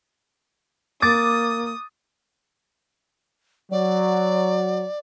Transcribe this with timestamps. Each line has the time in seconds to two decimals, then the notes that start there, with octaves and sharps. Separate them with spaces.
1.02 A#3 D6 D#6 A6
3.71 F#3 D5